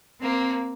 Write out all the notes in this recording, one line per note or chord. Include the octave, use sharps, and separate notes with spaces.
A#3 C4